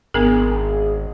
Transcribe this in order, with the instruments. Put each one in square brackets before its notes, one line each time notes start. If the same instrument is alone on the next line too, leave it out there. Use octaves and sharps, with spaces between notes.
[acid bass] G#1 [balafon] B3 D4 A#4 [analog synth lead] G#4